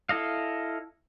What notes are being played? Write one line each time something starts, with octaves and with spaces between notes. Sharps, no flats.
E4 A4 D#5 F5